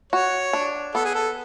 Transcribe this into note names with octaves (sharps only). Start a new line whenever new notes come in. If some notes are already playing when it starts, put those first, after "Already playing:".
F#4 C#5
D4
B3 A4
G#4
A4